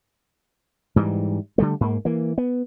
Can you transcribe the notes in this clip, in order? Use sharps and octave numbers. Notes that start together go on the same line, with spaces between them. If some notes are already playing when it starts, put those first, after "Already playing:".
G#2 E3 F#3 G3
D3 G3 A3
G#2 A#3
E3 A#3
B3